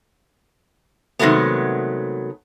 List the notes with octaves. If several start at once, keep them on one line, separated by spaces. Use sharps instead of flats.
C3 D#3 F#3 G#3 A3 B3